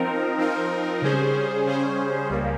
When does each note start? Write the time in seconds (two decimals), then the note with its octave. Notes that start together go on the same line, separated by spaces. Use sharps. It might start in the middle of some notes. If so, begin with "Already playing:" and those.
Already playing: F3 C4 D#4 A#4
0.38 F3 C4 D#4 A#4
1.02 C#3 G3 C#4 G#4 C5
1.66 C#3 G3 C#4 G#4 C5
2.30 C#2 C#3 G3 A#3